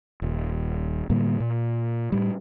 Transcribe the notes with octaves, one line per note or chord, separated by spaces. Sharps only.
D#1
A2 D3 G3 A#3
A#2
A2 G3